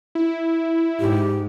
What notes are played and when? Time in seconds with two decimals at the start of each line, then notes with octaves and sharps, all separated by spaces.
0.15 E4
1.00 G#2 G4